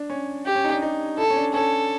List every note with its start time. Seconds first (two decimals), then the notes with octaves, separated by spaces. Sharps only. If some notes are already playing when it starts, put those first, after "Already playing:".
Already playing: D4
0.10 C#4
0.46 G4
0.55 C#4
0.64 D#4
0.72 D4
0.82 D#4
1.18 E4 A4
1.30 C#4
1.36 D4
1.54 C#4 A4